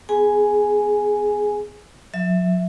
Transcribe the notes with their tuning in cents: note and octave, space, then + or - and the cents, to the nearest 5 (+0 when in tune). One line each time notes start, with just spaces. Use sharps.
B3 +25 G#4 +5 G#5 +0
F#3 -40 E5 -5